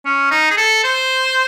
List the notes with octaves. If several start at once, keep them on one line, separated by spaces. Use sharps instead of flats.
C#4
D#4
G#4
A4
C5